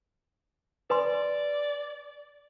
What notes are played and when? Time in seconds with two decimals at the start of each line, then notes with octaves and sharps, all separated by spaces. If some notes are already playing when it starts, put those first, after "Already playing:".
0.90 B4 D5 G#5 C6